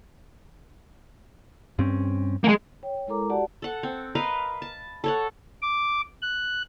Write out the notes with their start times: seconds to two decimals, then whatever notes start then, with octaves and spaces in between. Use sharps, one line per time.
1.79 G2 C4 C#4
2.44 G#3 A#3
2.83 C#5 G5
2.95 C#5
3.07 G#3 E4 A4 A#4 A#5 D6
3.30 F#4 G4 D5 F#5 A5
3.62 A4 F#5
3.83 C4
4.15 A#4 B4 D#5 F5
4.62 A5
5.04 A4 C#5 F#5
5.62 D6
6.22 F#6